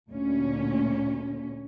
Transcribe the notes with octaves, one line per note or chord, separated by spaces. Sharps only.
D2 A#2 C#4